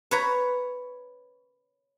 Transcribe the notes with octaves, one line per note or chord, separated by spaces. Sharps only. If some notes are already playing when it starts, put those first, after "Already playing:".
B4 C#5 A#5